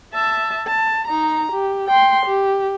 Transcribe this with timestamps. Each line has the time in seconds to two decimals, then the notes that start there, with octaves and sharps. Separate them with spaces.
0.14 E5 A5
0.67 A5
1.08 D#4 A#5
1.52 G4
1.87 G5 C6
2.26 G4